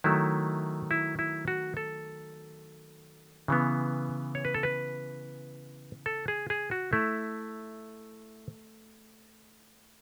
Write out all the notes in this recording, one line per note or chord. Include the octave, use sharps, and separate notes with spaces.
D#3 F#3 A3 E4
E4
E4
F#4
A4
C#3 E3 B3
C#5
B4
A4
B4
A4
G#4
G#4
F#4
A3 E4